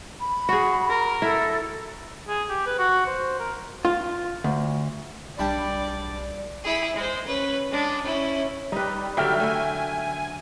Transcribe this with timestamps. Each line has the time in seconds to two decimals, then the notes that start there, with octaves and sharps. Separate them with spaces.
0.20 B5
0.49 F#4 G#4
0.90 A#4
1.22 E4 A4
2.28 G#4
2.49 G4
2.66 B4
2.78 F#4
3.06 C5
3.39 A#4
3.85 F4
4.44 D2
5.39 B1 G3 D4 D5 B5
6.64 E4 G#4
6.96 G#3 C5
7.26 C#4 B4
7.71 G#3 D4
8.03 C#4 E4
8.72 G3 D#4 B4
9.17 D3 F#3 E5 G5 F6
9.40 A3 G#5